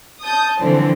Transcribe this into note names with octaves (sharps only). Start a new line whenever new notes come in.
A5 D#6 G6
D3 E3 F3 C4 D4